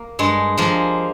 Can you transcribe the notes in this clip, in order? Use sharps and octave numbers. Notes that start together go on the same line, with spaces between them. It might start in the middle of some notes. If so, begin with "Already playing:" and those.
Already playing: A#3
G2 G#3
F3 G#3 A#3